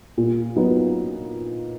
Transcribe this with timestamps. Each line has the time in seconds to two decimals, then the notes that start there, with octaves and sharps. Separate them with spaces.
0.17 A#2
0.56 F#3 B3 D#4